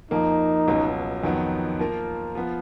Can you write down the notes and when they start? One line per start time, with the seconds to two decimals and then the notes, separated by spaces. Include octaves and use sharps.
0.11 F2 F3 A#3 D#4
0.67 C#2 B2 F#3 C#4
1.23 F2 D#3 F#3 B3
1.79 F3 A#3 F4 A#4
2.35 F3 B3 F4